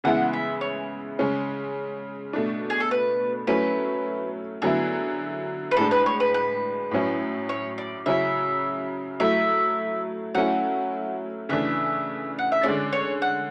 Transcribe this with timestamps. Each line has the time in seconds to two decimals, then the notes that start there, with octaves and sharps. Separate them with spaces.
0.04 C#3 E3 G#3 B3 E4 F#5
0.33 E5
0.61 C#5
1.19 C#3 G#3 C#4
2.33 B2 A3 D4
2.70 G#4
2.80 A4
2.91 B4
3.47 F#3 A3 C#4 E4 B4
4.62 D3 F#3 B3 E4 G#4
5.71 B4
5.77 A2 G#3 D4 A4
5.91 B4
6.06 C#5
6.20 B4
6.34 B4
6.91 A2 F#3 C#4 E4
7.49 C#5
7.78 D5
8.06 C#3 F#3 C#4 E4 E5
9.20 F#3 A3 E4 E5
10.35 F#3 A3 C#4 E4 F#5
11.49 C#3 E3 A3 D4 E5
12.39 F#5
12.52 E5
12.63 D3 G#3 C#4 D5
12.93 C#5
13.22 F#5